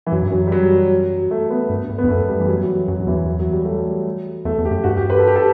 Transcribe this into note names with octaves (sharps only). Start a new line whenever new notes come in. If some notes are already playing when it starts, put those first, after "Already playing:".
E3
F#2 F#3
G2
F#2 F#3
G3
F#3
A3
B3
G2
G2
B3
E2
F#2 A3
G3
E3
F#3
F#3
F#3
F#2 F#3
F#2
E2 E3
F#3
F#3
G3
A3
G3
E2 A3
E2
G4
F#2
G2 F#4
G4
B4
A4
G4
A4